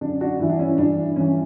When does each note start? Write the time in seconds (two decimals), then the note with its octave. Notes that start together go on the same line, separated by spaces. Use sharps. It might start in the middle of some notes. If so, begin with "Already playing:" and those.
0.01 F#2 D3 D4
0.21 D4 F#4
0.39 G2 E3 E4
0.49 D4
0.59 C#4 E4
0.78 G2 E3 D4
1.16 G2 E3 C#4